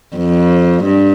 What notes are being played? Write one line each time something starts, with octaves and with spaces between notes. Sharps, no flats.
F2
G2